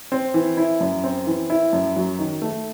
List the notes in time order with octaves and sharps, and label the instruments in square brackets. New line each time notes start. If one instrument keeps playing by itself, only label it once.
[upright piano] C4
E3
E4
F#2
C4
E3
E4
F#2
F#3
D#3
A3